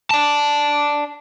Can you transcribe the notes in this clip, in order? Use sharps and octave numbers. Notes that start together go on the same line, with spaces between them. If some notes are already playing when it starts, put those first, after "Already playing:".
D5 A5